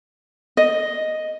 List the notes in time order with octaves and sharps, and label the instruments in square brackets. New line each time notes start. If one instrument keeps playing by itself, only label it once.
[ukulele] D#5